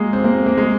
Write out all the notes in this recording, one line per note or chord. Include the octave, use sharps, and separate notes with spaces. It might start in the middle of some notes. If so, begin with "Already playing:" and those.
Already playing: G#3 A#3
C4
A#3
C4
A#3
G#3